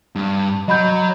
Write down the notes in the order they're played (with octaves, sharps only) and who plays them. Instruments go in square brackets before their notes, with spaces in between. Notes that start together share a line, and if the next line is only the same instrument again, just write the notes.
[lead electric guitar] G2
[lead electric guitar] F#3 [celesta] D#5 B5 G6